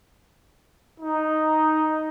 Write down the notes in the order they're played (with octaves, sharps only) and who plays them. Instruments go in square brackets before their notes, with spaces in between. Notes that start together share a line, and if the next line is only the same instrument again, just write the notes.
[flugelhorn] D#4